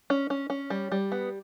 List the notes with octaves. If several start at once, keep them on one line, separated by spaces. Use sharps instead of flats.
C#4
C#4
C#4
G3
G3
B3